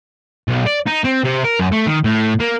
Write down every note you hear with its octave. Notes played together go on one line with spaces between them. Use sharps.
B1
D5
D#4
C4
C3
A#4
F#2
A3
D#3
A2
A#3